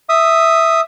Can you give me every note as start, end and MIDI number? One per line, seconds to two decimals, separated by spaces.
0.09 0.81 76
0.09 0.81 87